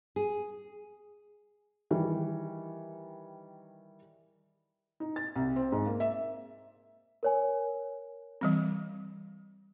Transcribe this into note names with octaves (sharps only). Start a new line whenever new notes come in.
G#4
D#3 E3 G3
D#4
A6
C2
C4
G#2
A#3
E5
A#4 C#5 G#5
E3 G3 C4